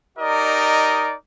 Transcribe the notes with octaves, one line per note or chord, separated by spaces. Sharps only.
D#4 G4 A#4 D5 D#5